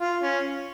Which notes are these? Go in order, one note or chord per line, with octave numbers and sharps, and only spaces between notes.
F4
C#4